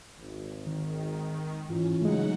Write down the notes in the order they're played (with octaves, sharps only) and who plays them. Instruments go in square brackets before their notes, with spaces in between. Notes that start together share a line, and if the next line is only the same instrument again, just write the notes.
[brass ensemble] G#1
[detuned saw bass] D#3
[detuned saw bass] G#2 [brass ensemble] E3 F4 [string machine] C#4
[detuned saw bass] C#3 [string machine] F#3 D#4 F#5 [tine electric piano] G#3 A3